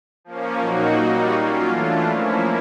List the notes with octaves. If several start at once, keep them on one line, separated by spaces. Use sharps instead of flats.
F3 A#3 C#4
A#2 F#3 A#3 D#4 F#4
G3 A#3 D#4 F#4
F#3 A#3 C#4 F4
E3 A3 D4 F4
F3 A#3 C#4 E4